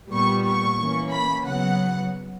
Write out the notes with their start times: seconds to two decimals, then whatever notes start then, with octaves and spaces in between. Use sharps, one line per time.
0.10 A#2 G3 B3 C#6
0.45 C#6
0.79 E3 A#3 C#4
1.12 B5
1.46 C#3 F#3 B3 F#5